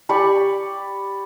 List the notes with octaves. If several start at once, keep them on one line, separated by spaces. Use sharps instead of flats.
G4 D5 B5 C#6